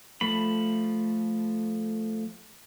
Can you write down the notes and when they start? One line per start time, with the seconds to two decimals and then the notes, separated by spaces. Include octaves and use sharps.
0.21 F3 A3 B5